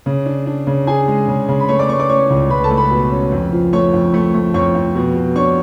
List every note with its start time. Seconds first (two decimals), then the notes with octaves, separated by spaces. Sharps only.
0.06 C#3
0.26 D4
0.46 D4
0.67 C#3
0.87 D4 G#4 G#5
1.08 G#3
1.28 C#3
1.49 C#3
1.60 B5
1.68 A3 C#5 C#6
1.79 D5 D6
1.89 A3 C#5 C#6
1.99 D5 D6
2.09 C#4 C#5 C#6
2.30 C#2
2.50 C#2 B4 B5
2.64 A4 A5
2.71 A3
2.77 B4 B5
2.91 B2
3.11 C#4
3.32 F2
3.52 F3
3.73 A3 C#5 C#6
3.94 F2
4.14 A3
4.34 A3
4.54 F2 C#5 C#6
4.75 F2
4.95 B2
5.16 B2
5.36 D4 C#5 C#6